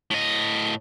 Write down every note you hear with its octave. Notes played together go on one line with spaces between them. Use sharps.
A2 D#5